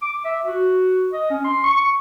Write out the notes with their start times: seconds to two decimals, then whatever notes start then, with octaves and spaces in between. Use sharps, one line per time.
0.02 D6
0.25 E5
0.45 F#4
1.13 D#5
1.30 C#4
1.44 C6
1.64 C#6